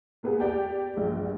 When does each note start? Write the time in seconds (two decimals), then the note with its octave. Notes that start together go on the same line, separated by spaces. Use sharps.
0.23 G#3 A#3 B3 G4 G#4
0.40 G4 D5 G5
0.96 A#1 G2 G#3